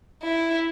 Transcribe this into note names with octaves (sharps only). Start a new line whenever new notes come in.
E4